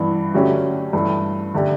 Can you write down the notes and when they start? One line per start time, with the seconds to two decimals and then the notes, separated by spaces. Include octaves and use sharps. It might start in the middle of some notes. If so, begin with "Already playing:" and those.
Already playing: G2 E3 B3
0.34 D3 F#3 A3 C#4 G4
0.93 G2 E3 A3
1.54 D3 A3 D4 G4